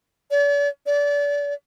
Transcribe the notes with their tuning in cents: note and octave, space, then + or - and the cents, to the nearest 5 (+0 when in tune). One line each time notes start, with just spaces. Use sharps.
D5 -45
D5 -30